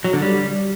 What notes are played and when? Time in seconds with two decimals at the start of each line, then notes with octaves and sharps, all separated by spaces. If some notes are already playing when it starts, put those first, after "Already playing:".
0.04 F#3
0.13 D3
0.22 G3